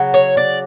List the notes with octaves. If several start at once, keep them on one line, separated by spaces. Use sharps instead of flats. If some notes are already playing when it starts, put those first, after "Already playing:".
Already playing: C#3 F#3
C#5
D5